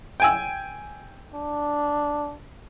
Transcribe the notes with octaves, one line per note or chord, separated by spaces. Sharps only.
G5 G#5 E6
D4